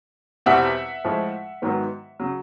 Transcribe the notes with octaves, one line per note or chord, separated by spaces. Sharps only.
E2 B2 G3 C4 E5 F#5
A2 F3 G#3
G#2 D#3 F#3 B3
C#3 F#3